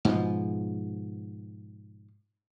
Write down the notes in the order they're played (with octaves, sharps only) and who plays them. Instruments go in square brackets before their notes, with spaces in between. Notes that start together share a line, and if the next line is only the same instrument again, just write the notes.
[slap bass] G#2 B2 F3